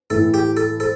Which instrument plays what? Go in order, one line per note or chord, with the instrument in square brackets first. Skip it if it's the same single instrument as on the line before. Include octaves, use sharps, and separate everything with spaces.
[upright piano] A2 E3 A3 [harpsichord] A4
[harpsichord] G4
A4
[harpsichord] A4 [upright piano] C5